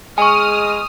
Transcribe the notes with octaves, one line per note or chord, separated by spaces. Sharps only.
G#3 G#5 C#6 D#6 F6